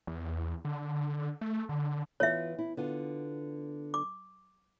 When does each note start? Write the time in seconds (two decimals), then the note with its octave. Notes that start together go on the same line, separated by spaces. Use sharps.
0.07 E2
0.65 D3
1.41 A3
1.69 D3
2.20 E3 B3 F4 C#5 E5
2.59 E4
2.77 D3 B3 F4
3.94 D6